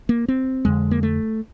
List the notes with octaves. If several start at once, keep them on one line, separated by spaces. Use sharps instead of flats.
A#3
C4
F2 D3 G#3
A#3
A3